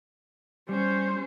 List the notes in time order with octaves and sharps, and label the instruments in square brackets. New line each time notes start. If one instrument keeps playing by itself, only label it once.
[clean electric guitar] G3 [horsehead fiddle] C#4 C5